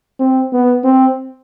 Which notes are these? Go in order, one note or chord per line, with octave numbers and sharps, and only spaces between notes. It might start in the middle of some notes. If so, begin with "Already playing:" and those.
C4
B3
C4